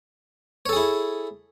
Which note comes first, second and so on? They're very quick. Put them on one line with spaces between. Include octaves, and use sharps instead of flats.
C#5 A4 G#4 E4